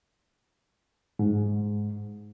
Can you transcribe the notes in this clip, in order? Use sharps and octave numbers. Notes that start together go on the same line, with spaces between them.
G#2